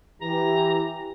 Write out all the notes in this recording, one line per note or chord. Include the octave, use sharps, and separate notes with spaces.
E3 G4 A#5